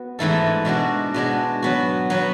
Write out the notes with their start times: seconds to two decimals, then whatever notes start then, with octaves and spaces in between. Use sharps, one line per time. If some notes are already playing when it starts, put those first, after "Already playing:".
Already playing: B3 F#4
0.19 G#2 E3 A3 E4 A4
0.65 B2 G#3 D4 F#4
1.14 B2 G#3 D4 F#4
1.62 F#3 B3 F#4
2.10 F#3 B3 F#4